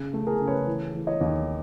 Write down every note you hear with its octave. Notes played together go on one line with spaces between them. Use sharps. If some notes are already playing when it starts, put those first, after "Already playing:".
Already playing: C#3
A3
G#4 A#4
C#3
B4 C#5
E3
E3
C#5 D#5
D#2